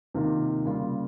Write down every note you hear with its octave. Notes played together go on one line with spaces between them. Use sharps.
C3 D#3 A#3 F4
C#3 G3 A#3 F4